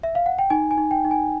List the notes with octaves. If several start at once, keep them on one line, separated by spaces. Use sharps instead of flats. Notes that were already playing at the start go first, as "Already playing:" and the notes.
E5
F5
F#5
G5
D#4 G#5
G#5
D#4
G5
D#4
G#5